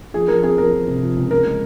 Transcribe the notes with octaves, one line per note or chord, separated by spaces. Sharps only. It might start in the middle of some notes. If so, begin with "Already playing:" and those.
F3 G#4
F3 A#4
C4 G#4
F3 A#4
F3
C3
F3
C#2
C#3 A#4
G#3